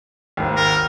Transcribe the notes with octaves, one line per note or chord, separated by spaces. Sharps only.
G#1 D#2
A#4